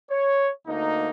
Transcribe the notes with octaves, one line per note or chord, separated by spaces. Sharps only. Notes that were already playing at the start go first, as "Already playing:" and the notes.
C#5
D2 A#3 D#4